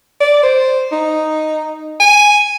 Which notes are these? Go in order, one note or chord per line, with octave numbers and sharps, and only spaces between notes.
D5
C5
D#4
G#5